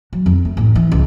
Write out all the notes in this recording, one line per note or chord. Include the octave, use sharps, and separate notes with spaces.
F#3
F2
A3
A1
E3
C#2